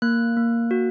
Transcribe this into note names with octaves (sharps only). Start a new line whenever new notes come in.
A#3 F#6
A#3
F#4